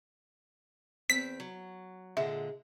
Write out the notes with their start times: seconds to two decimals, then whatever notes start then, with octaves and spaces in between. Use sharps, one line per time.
1.10 E2 C4 B6
1.40 F#3
2.17 A#2 D3 G#3 E5